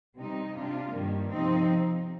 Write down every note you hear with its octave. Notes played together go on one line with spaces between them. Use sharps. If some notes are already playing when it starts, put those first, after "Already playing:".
C3 G3 C4 D#4
C3 G3 D4 F4
G2 D#3 G3 A#3
C3 F3 C4 D#4